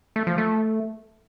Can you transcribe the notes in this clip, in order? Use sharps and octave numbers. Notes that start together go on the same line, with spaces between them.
A3
F3
A3